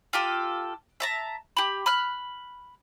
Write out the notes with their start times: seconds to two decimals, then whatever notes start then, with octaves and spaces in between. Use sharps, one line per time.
0.13 F4 G4 A4
1.00 E5 A5 A#5
1.57 G4 B5
1.86 B5 F6 F#6